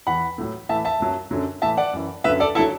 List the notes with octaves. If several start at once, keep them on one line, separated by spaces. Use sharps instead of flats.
E2 E3 F#5 B5
A2 F#3
A2 E3 E5 A5
E5 A5
F#2 F#3
F#2 D3 F#3
A2 E3 E5 A5
D5 F#5
F#2 E3
F#2 D3 F#3 B4 E5
A4 D5
D3 F#3 E4 A4